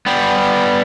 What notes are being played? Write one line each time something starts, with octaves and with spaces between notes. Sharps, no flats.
G3 B3